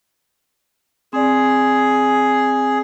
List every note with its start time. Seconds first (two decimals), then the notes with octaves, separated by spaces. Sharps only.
1.13 C4 G#4 D5